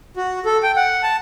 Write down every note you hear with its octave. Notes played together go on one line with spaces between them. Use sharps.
F#4
A4
G5
F#5
A5